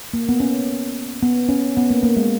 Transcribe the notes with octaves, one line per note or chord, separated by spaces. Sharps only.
A#3
B3
C#4
B3
C#4
B3
A#3
A#3
G#3